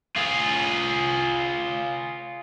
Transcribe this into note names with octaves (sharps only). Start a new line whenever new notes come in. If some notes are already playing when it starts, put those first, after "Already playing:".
F4 G#4